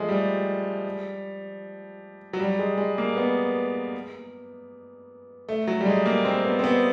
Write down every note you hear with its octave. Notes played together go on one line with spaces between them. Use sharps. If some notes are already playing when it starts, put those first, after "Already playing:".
Already playing: F3 G#3 A3
G3
F#3
G3
G#3
G#3
A#3
B3
A3
F#3
G3
G#3
A#3
C4
B3
C4
B3